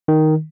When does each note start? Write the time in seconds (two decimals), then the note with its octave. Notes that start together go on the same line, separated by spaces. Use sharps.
0.08 D#3